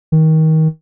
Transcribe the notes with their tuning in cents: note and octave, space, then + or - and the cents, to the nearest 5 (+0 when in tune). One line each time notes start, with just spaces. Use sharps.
D#3 +25